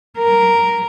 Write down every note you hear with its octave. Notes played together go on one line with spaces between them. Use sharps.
A#4